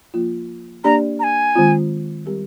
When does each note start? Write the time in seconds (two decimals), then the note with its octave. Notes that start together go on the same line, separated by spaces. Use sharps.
0.14 F3 A#3 F4
0.84 A#3 D4 G4 D5 A#5
1.20 A#5
1.24 G#5
1.55 D#3 G#3 C4 F4
2.26 G3 C4 G4 A#4